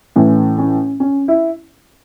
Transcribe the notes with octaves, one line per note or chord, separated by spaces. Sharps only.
A2 E3 C#4
C#4
C#4
E4